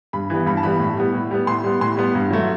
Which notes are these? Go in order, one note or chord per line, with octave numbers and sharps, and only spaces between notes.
G2 B5
E3 G3 B3
G2 B5
A5
E3 G3 B3 B5
A2
G3 B3
A2
G3 B3
A2 C6
G3 B3
A2 C6
G3 B3
G2
F#3 A3